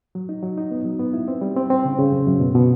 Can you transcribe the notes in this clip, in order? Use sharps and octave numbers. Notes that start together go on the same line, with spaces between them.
F#3
D#4
F#3
D#4
B3
F#3
B3
E4
C4
G3
C4
C4
C#3
C#3
F#2
F#2
B2
B2